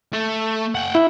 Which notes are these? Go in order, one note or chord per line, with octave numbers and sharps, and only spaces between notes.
A3
F#5 G5
E4